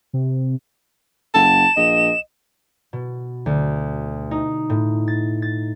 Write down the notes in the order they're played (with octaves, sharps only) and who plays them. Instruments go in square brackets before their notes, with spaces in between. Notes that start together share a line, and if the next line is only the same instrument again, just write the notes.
[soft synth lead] C3
[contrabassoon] F#1 [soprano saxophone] A5 [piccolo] E7
[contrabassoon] A#1 [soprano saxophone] D#5
[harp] B2
D2
D#4
A2
A6
A6